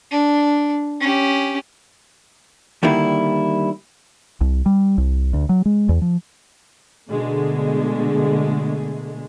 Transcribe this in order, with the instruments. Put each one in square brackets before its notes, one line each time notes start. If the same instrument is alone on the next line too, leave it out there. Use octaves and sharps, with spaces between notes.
[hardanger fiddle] D4
C#4 G4
[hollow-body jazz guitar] D3 D#3 G3 A#3 E4
[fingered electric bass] C2
G3
C2
D2
F#3
G#3
E2
F3
[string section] B2 D3 G#3 A3